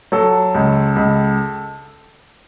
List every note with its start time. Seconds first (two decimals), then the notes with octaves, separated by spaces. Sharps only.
0.12 F#3 A4
0.55 C#2
0.96 C#2